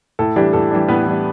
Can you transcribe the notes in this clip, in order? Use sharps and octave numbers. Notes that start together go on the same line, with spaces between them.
A2 A4
E3 G3 D4 G4
A2 A4
E3 G3 D4
A2 B3 B4
E3 G3 D4